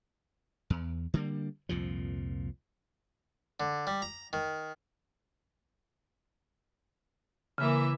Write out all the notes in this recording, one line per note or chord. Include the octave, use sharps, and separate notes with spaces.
E2
D3 G3 A#3
C2 F2 A#2 F3
D3
G3
A#5
D#3
C#3 E3 A#3 E5